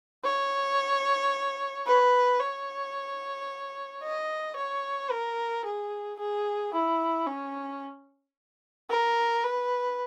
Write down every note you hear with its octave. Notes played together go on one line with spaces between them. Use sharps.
C#5
B4
C#5
D#5
C#5
A#4
G#4
G#4
E4
C#4
A#4
B4